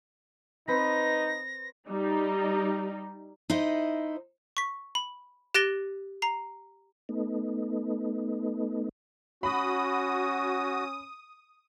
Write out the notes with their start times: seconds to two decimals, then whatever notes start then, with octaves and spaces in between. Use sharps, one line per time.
0.68 C4 D#4 B4 B5 A#6
1.88 G3 D#4
3.50 D#4 E4 C5 D#5
4.57 C#6 B6
4.95 B5
5.54 G4 F#6 A6 A#6 D7 G7
6.22 A#5 C7
7.09 A3 B3 D#4
9.43 C#4 F#4 B5 D#6